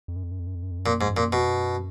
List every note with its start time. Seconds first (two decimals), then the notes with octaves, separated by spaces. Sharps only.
0.08 F2
0.16 F#2
0.23 F2
0.31 F#2
0.39 F2
0.47 F#2
0.55 F2
0.63 F#2
0.71 F2
0.79 F#2
0.86 F2 A#2
0.94 F#2
1.01 F2 G#2
1.09 F#2
1.17 F2 A#2
1.25 F#2
1.33 F2 B2
1.47 F#2